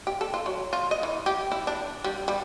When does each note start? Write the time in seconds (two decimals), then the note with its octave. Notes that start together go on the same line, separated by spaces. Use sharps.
0.07 G4
0.21 A4
0.34 F4
0.46 F#3
0.73 F4
0.91 D#5
1.03 E3
1.26 G4
1.52 E4
1.67 D4
2.04 G3
2.28 G3